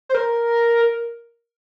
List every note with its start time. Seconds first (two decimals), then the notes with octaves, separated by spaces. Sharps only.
0.09 C5
0.14 A#4